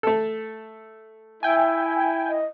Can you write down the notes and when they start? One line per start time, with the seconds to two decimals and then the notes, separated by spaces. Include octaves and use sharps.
0.03 A3 A4
1.43 E4 E5 G5 G#5
2.29 D#5